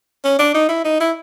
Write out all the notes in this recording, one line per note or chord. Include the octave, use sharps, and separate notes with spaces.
C#4
D4
D#4
E4
D#4
E4